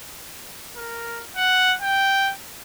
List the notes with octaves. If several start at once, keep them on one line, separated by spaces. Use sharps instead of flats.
A#4
F#5
G5